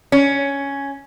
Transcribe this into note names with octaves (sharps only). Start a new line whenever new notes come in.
C#4